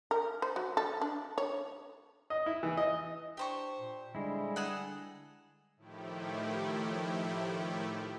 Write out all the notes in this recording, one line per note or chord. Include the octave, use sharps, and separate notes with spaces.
A#4
C5
F#3
A4
D4
C#5
D#5
E4
E3
D#5
D4 G4 C5 C#6
A#2
D3 G3 G#3 E4
G#4 A4 F#5
A2 D#3 F3 A3 E4 G4